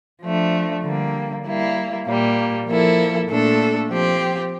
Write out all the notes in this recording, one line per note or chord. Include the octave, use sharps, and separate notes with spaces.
F3 A3 D4
D3 G3 A#3
G3 A#3 E4
A#2 G3 A#3
F3 A#3 E4 A4
A#2 A3 D4 A4
F3 C4 G4